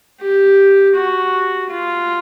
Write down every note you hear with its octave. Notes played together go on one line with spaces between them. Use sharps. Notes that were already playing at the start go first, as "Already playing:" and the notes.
G4
F#4
F4